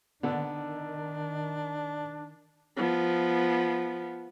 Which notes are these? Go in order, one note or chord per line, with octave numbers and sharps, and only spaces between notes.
D3 D#3 B3 D4
F3 B3